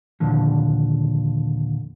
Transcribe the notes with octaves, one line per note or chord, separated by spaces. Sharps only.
D#2 A#2 D3 F3